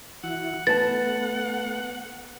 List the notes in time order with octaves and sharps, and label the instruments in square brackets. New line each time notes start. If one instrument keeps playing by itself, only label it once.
[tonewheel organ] E3 E4 F#4 [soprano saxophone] F#5
[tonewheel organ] A3 B3 [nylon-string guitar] B4 A5 [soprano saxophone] F#5 [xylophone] A6